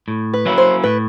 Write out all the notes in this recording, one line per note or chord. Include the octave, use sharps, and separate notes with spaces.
A2
B4
F#3 A#3 C#4 E4
C5
A2 B4